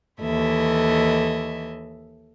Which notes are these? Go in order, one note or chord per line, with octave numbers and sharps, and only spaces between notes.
D#2 E3 A4 D#5 E5